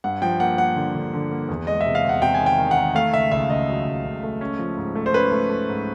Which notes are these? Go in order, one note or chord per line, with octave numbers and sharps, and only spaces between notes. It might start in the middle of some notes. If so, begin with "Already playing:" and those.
G2 F#5
F3 G5
A#3 F#5
A#3 F#5
D3
D3
D3
A#3
E2
G#3 D#5
E5
C3
F5
E2 F#5
C3 G5
G#5
D#3
G5
D#3
F#5
D#3
A3 F5
C#2 E5
C#2 E5
C#2 D#5
F#3
C#2
C#2
A3
C#4
F3
G#2
A3
C5
C#4 B4
A3
A3
G#2